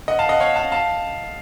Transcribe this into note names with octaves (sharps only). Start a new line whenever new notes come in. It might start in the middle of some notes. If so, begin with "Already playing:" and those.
D#5 F#5
F5 A5
D#5 F#5
C#5 F5
F5 A5
F5 A5